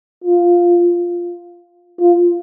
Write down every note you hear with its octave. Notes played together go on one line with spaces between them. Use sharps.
F4
F4